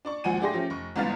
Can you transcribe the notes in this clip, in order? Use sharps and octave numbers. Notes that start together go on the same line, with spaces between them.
D4 D5 C#6
G#1 D2 F3 F#5 G#5 D#7
A3 D4 G4 G#4 C6 A#6
F3 A3 C#4 G4
F1 C#6
G1 E2 G#2 B3 F5 A6